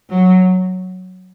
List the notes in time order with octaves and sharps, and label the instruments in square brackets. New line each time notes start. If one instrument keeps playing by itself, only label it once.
[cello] F#3